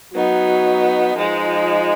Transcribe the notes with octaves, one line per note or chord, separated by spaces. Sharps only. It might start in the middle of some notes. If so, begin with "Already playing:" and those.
F#3 B3 D#4
F3 G#3 D#4